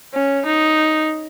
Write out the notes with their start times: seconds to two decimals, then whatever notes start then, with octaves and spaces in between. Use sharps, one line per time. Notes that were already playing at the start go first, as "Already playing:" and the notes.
0.14 C#4
0.46 D#4